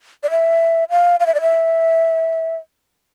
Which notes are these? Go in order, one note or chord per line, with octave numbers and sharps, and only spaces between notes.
D5
E5
F5
F5
E5
D5
E5